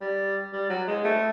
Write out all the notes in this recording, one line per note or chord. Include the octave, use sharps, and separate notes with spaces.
G3
G3
F#3
G#3
A3